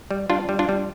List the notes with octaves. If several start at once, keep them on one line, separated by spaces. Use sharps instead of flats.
G3
G3 D4 F4
G3
D4 F4
G3